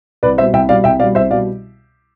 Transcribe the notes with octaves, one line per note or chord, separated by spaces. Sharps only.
C2 B4 D5
B2 G3 C5 E5
C2 E5 G5
B2 G3 D5 F5
C2 E5 G5
B2 G3 D5 F5
C2 C5 E5
B2 G3 D5 F5